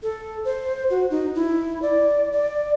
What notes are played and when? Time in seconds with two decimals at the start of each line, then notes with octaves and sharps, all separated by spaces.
0.03 A4
0.45 C5
0.90 F#4
1.11 D#4
1.35 E4
1.82 D5
2.32 D5